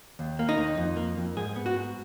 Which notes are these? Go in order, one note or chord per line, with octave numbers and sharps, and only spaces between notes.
D#2
A#3
D#4
D#2
F2
A#3
F2
G#2 G#4
B3
F#4
G#2